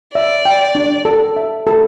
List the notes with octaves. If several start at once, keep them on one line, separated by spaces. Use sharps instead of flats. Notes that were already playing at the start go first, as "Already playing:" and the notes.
D5 E5
G5
D4
A4
E5
A4